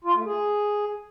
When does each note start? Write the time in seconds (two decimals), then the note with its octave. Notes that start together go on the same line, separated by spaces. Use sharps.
0.04 F4
0.15 A3
0.25 G#4